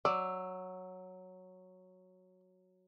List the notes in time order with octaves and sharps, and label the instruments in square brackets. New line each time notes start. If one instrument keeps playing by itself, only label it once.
[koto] F#3 [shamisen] D5 [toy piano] E6